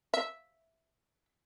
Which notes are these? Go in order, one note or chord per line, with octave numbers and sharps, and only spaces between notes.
E5